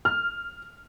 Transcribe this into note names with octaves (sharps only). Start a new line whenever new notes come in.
F6